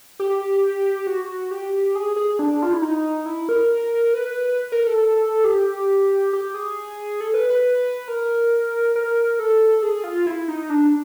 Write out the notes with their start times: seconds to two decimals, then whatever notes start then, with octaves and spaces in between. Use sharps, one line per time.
0.20 G4
1.07 F#4
1.51 G4
1.95 G#4
2.16 G#4
2.39 D4
2.63 F4
2.73 E4
2.82 D#4
3.26 E4
3.49 A#4
4.14 B4
4.72 A#4
4.87 A4
5.44 G4
6.33 G4
6.54 G#4
7.21 A4
7.34 B4
7.50 B4
8.08 A#4
8.96 A#4
9.39 A4
9.83 G#4
10.04 F4
10.26 E4
10.48 D#4
10.70 D4